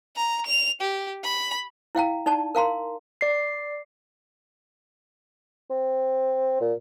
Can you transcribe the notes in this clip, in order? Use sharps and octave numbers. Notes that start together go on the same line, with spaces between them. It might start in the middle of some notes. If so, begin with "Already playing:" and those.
A#5
F7
G4
B5
E4 F5 G5 A#5
D#4 D5 A5
A#4 F5 A#5 C6
D5 C7
C4
A#2